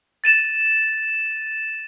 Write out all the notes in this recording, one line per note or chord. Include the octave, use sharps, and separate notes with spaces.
A6 D#7 E7